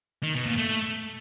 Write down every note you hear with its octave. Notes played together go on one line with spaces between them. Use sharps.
D#3
B2
A#2
A3